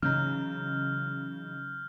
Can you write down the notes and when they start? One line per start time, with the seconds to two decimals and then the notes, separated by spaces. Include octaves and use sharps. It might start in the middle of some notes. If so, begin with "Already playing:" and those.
0.02 C#3 E3 F#3 D#4 A#5 F6 G6